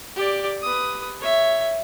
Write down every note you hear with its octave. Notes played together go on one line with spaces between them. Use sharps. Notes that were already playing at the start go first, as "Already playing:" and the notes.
G4 D5
B4 D#6
C#5 E5